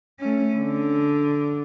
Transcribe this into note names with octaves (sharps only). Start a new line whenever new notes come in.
A3 C#4
D3